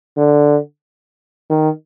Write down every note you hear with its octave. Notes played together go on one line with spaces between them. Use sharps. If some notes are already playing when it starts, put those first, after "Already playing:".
D3
D#3